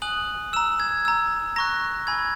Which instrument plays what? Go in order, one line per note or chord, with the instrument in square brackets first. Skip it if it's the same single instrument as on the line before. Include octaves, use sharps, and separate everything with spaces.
[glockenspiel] G#5 D#6 F#6 F#7
A#5 E6 E7
G#6
A#5 E6
A#5 C#6 F#6 A#6
G#5 B5 E6 G#6